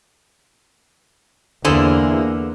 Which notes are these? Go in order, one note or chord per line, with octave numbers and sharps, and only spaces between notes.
E2 D3 A#3 E4 G#4 C5